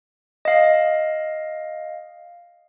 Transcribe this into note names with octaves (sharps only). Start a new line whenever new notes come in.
D#5 F5